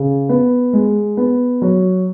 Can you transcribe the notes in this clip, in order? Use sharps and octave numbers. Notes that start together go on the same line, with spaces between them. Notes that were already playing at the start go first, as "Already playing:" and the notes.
Already playing: C#3
B3
G#3
B3
F#3